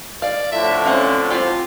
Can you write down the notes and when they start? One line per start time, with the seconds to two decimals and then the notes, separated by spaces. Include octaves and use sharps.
0.22 D5 F5
0.52 A2 D3 F3 E5
0.86 C4 C#4 F4
1.30 C4 F4 G4